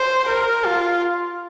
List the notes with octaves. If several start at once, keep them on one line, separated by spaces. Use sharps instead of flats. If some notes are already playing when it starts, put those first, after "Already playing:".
Already playing: C5
A#4
F4